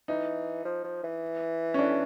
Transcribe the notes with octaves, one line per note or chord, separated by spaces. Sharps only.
E3 D#4
F3
F3
E3
C#4
D4